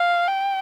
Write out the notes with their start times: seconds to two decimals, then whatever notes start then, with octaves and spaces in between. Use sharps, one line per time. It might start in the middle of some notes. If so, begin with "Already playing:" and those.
Already playing: F5
0.28 G5